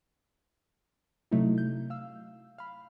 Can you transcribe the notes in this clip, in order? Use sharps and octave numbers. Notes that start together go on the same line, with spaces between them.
C3 F#3 A3 D#4 E4
G6
F5 E6
F5 B5